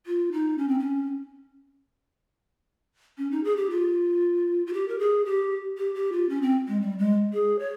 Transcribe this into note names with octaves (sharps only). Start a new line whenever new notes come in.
F4
D#4
C#4
C4
C#4
C#4
D#4
G#4
G4
F4
F4
G4
A#4
G#4
G4
G4
G4
F4
C#4
C4
G#3
G3
G#3
G#4
C#5